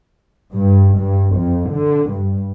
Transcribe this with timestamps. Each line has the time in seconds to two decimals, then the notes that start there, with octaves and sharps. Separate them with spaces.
0.54 G2
0.99 G2
1.36 F2
1.73 D3
2.11 G2